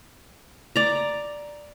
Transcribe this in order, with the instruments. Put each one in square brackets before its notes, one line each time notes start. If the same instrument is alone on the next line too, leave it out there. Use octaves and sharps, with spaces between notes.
[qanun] D5 A#5